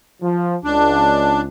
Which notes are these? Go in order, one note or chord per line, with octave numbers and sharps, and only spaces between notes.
F3
C#2 D4